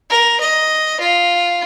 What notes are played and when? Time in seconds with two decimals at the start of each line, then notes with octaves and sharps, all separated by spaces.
0.10 A#4
0.40 D#5
1.00 F4